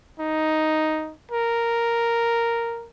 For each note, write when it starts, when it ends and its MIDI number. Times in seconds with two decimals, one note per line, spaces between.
0.20 1.13 63
1.31 2.87 70